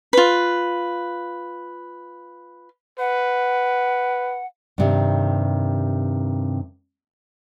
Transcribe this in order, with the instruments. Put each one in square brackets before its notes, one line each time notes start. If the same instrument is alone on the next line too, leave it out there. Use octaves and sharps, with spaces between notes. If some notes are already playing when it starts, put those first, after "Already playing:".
[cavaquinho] F4 B4
[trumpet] B4 [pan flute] F#5
[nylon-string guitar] G2 C3 D#3